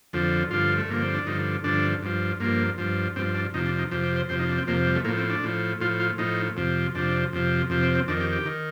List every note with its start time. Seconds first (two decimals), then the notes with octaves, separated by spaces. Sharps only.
0.13 F2 D3 F3
0.51 G2 D3 F3 F4
0.78 A3
0.88 G2 D3 F3 A#3
1.02 C4
1.14 D4
1.27 G2 D3 F3 D#4
1.64 G2 D3 F3 D4
2.02 G2 F3
2.40 G2 F3 A#3
2.78 G2 F3
3.16 G2 F3 C4
3.35 D4
3.54 F2 C3 F3 D#4
3.66 D4
3.79 D#4
3.91 F2 C3 F3 G4
4.04 G4
4.16 C5
4.29 F2 C3 F3 C5
4.39 D#4
4.48 D4
4.58 C4
4.67 F2 C3 F3 A#3
4.87 G3
4.96 A3
5.04 A2 F3 A#3
5.17 C4
5.30 D4
5.44 A2 F3
5.81 A2 F3 F4
6.00 F4
6.18 A2 F3 D#4
6.57 F2 C3 F3
6.95 F2 C3 F3 D4
7.33 F2 C3 F3
7.70 F2 C3 F3
7.83 C4
7.95 C4
8.08 F2 D#3 D4
8.20 G4
8.33 G4
8.46 D#3